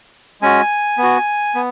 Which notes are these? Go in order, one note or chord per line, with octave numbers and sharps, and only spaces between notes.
G#3 C#4 F#4 G#5
B3
F#4
B3